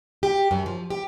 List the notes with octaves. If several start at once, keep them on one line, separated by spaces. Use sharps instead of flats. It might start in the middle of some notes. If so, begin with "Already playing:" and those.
G4
F#2
F3
G4